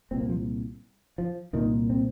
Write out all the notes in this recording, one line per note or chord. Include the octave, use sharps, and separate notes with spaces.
C2 A#2 C4
A#3
F3
F3
C2 A#2 D#3
C4